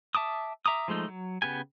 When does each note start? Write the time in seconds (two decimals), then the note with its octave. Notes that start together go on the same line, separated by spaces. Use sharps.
0.15 E5 A5 D6 D#6
0.66 E5 A#5 D6 D#6
0.88 F3 G#3 A3 D#4
1.08 F#3
1.42 C#3 B3 G4 G#5